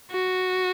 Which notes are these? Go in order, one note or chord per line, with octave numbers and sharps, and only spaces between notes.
F#4